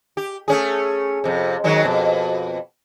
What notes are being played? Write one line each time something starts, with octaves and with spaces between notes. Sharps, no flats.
G4
A3 C#4 G#4
F2 C3
D#3 F#3 G#3
F2 B2